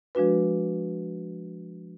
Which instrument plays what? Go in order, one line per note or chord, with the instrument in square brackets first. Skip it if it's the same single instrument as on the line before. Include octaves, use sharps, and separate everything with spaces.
[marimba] F3 G#3 D4 F#4 B4